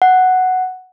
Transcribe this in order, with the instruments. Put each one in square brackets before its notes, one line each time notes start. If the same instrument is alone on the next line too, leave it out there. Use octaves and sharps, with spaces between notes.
[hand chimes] F#5